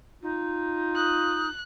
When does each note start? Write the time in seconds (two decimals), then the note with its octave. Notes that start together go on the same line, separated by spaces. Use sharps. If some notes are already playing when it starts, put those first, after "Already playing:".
0.22 D#4 F4
0.96 D#6 F#6